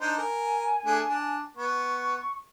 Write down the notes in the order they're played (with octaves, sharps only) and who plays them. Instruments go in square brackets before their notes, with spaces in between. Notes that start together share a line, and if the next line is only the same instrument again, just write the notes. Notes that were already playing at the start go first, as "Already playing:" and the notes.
[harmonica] D4 D#4 C5 [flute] G6
[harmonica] A#4 [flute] G#5
[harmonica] A3 D4 G#4
D4
[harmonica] B3 [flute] C#6